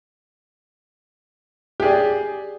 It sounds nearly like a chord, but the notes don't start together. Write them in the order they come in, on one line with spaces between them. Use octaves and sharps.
G4 G#4 D5